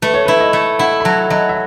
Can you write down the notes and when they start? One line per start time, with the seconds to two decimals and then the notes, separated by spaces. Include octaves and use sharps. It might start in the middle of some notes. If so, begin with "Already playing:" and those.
0.02 A3 B4
0.14 C#5
0.25 E4 B4
0.41 D#5
0.53 A3
0.79 E4 F#5
1.01 B5
1.05 F#3 A5
1.30 F#3 D#5
1.49 E5